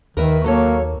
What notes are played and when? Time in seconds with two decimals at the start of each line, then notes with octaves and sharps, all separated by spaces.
0.17 D#2 D#3 A#4 B4 E5
0.44 F#3 A#3 A4 C#5